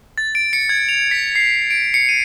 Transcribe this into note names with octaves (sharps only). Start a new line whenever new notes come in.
A6
D7
C#7
G#6
F7
B6
C7
D7
C#7
D#7